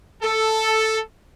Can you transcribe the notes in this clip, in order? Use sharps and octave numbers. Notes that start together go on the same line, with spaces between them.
A4